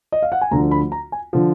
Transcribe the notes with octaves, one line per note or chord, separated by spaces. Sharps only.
D#5
F5
F#5
G#5
D2 D3 F3 A#5
B5
A#5
G#5
D3 F3